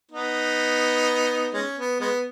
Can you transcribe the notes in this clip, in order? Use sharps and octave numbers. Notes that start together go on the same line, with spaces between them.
B3 D#4
G#3 C#4
B3
G#3 B3